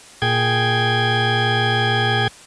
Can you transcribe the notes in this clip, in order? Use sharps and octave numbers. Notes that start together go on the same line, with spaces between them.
A#2 G#4 G5 G#6